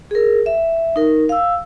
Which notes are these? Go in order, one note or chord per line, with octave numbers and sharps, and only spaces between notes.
G#4 A#4
E5
D#4 A#4
F5 E6